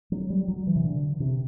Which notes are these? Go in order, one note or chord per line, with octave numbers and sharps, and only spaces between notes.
F#3
G3
F#3
E3
C3
D3
C3